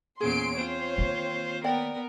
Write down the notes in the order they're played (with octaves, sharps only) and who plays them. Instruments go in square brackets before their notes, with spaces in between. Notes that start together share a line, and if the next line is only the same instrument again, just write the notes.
[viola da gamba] E2 A#2 C#4 [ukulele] G#4 [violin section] C6 C7 D7
[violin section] C4 C#5 [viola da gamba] F4 C5
[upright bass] D#3 A#3
[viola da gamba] B3 A#4 [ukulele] D5 G5